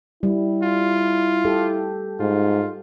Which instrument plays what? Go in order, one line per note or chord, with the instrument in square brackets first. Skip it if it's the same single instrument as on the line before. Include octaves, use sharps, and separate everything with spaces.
[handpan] G3 [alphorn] E4
[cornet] F4
[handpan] G4 A4
[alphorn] G#2 [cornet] F4